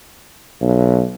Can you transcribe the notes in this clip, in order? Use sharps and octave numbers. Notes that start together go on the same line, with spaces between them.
B1